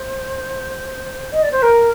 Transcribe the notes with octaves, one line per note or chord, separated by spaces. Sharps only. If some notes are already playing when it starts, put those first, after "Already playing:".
Already playing: C5
D#5
D5
C5
A#4